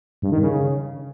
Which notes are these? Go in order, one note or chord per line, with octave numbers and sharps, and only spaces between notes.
G2
D#3
C#3